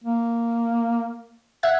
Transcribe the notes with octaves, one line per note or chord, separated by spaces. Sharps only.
A#3
E5 F#5 G#6